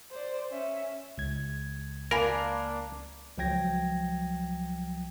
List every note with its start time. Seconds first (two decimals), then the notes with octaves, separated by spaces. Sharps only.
0.12 C5 D5
0.51 C#4 E5
1.18 C#2 G#6
2.11 A#3 D4 A#4 G#5 B5
3.38 C#2 F3 F#3 G5 G#6 A#6